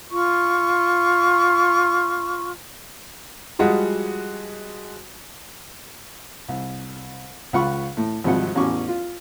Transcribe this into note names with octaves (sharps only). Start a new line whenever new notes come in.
F4 C#6
F3 G3 G#3 F#4
C2
C#2 F4 F#5 B5 C#6
A2
G#1 C3 F3 G3 F#5
A1 E2 C#4 F#4 C#6 D6
F4